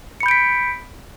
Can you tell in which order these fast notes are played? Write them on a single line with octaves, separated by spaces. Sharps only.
C#7 B5 G6 D7 B6